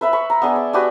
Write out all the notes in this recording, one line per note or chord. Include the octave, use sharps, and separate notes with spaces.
B4 E5 B5
B5 C#6
A#5
B3 D4 G#4
D5
D4 F#4 G4 B4